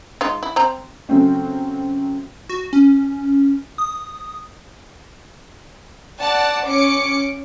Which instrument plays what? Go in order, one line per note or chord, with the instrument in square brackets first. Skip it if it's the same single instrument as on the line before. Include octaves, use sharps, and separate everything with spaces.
[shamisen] G#3 D#4 F4
E4
C4 C5 A#5
[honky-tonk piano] C#3 F#3 A3 C4 C#4
[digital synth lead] F#4
C#4
D#6
[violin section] D5 F#5 A5
C#4 D6 C#7